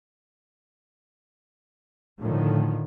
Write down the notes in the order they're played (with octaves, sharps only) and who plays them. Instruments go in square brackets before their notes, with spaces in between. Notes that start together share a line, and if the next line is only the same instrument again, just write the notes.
[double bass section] A2 D3 D#3 F3